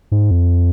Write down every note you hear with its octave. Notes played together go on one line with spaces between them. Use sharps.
G#2
F2